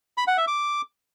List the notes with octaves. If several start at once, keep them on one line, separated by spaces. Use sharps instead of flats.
B5
F#5
E5
D6